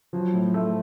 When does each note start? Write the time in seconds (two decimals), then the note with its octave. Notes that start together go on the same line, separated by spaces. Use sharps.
0.13 F3 F#3
0.34 A2
0.44 F3
0.54 A3